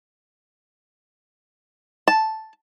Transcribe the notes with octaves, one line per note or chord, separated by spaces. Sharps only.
A5